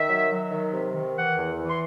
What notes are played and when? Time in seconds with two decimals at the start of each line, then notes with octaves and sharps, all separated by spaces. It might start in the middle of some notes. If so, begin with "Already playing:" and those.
Already playing: D#3 E5
0.08 F#3
0.30 F#3
0.51 D#3
0.73 C3
0.94 D#3
1.15 E3 F#5
1.37 E2
1.58 E3
1.69 C6